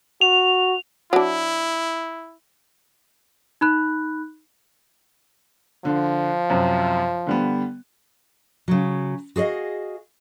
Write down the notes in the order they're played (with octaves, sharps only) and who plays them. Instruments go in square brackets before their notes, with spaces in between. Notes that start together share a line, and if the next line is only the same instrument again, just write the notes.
[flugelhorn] F#4 [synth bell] F7
[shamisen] F#3 D4 [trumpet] E4
[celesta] D#4 B5 F#6
[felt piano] D3 [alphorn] F3
[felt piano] F#2 C3
D3 G3 B3
[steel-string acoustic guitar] C#3 F#3
F#4 G#4 D5 D#5 F5